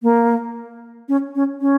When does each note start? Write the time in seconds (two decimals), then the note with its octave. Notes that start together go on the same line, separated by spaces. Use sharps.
0.03 A#3
1.09 C#4
1.35 C#4
1.61 C#4